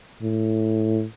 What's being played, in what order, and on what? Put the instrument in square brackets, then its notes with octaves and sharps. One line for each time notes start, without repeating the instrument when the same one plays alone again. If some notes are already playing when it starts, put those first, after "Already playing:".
[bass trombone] A2